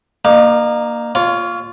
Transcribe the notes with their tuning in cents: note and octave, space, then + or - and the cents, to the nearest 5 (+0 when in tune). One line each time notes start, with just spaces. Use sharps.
A#3 +0 D#4 -40
F4 +0 C#5 +25